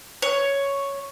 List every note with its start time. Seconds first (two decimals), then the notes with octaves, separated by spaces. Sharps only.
0.22 C#5